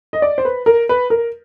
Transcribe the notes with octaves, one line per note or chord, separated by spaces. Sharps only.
D#5
D5
C5
B4
A#4
B4
A#4